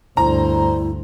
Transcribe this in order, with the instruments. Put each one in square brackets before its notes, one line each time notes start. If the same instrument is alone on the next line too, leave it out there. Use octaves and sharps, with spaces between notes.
[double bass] D2 G2 [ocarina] E4 [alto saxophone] C5 [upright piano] A#5